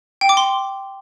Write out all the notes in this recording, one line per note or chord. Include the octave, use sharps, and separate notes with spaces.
G5
D6
C6